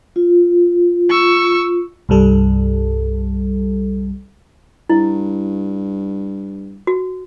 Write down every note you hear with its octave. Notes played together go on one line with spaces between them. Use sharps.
F4
C#6 E6
C2 G2 G3 A4
G2 E4
F#4